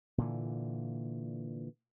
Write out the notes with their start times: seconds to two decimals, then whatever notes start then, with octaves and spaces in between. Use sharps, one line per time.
0.18 A#2 D3 E3